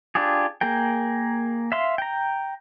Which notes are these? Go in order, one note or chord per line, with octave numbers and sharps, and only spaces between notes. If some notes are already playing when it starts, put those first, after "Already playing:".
D4 F4 G4 G#4
A#3 G#4 A#4 G5
E5 F5 C6
G5 A#5